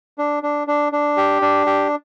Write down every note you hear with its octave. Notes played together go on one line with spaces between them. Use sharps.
D4
D4
D4
D4
G4
D4
G4